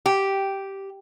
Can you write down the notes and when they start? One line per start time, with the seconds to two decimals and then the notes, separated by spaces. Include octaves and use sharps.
0.06 G4